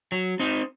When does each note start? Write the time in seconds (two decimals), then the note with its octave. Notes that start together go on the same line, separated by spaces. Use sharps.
0.12 F#3
0.40 C4 D#4